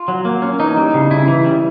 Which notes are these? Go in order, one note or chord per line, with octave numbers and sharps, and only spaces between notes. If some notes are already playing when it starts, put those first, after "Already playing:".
Already playing: F4
F#3
A#3
C#4
E3 D#4
G3
C#3
C#3 E4
E3
G3